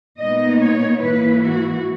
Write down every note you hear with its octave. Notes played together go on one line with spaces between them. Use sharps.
A#2 G#3 B3 D#4 D#5
C#5
G#2 E3 A#3 E4 B4
F#4